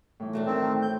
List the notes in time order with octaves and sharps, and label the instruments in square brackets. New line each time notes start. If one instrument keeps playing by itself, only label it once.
[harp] A2 E3
[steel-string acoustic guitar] F#3 A3 D4
[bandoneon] D#3 C4
G6